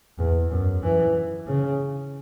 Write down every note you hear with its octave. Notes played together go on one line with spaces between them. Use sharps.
E2
F#2
E3
C#3